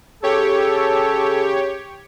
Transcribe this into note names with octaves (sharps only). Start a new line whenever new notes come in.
C#3 G4 A4 C#5